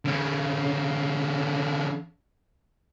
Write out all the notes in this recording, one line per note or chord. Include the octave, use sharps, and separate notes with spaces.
D3 C#4